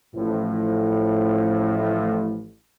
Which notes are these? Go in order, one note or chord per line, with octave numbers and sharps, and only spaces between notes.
A1 A2 F3